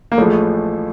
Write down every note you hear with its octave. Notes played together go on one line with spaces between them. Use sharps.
A#3
A1 A2 F3 G#3 A3